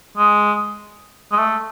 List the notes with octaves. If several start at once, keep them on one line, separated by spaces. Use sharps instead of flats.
G#3
G#3
A3